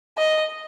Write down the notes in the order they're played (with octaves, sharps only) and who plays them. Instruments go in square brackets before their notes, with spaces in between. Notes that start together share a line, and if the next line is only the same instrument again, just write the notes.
[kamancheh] D#5